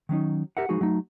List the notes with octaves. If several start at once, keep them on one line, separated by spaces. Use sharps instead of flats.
D#3 F#3 C#4 D#4
G4 A#4 E5 F#5
F3 G#3 D#4 F#4 G#4
F#3 A3 D#4